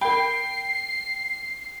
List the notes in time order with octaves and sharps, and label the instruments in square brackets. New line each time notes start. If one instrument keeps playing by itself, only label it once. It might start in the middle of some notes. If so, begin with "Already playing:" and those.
[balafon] A#4 B5 [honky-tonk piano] G5 [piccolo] C7